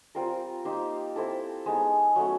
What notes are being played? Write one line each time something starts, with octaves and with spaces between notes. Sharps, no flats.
G3 C4 F4 A#4
A#3 D#4 G4 C5
C4 E4 A4
G#3 B3 D#4
F#3 A3 C#4